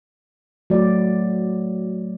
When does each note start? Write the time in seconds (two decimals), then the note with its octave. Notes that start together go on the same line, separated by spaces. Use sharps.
0.70 F#3 A3 D5